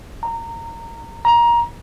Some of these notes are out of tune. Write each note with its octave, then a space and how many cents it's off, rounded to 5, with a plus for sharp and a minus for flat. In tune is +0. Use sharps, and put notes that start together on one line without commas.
A#5 -20
A#5 +20